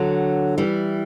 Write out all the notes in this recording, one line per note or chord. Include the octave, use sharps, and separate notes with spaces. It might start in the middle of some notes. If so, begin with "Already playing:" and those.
Already playing: D3 F#3
E3 G3